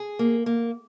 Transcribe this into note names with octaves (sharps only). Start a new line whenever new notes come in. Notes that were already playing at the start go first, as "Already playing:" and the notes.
Already playing: G#4
A#3
A#3